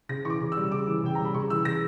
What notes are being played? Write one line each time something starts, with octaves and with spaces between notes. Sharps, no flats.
C#3 A#6
E3 C#6
D6
C#3
E6
G3
C#3 D6
E3
C#3 G5
G3 A#5
B5
C#3 C#6
E3 E6
C#3 A#6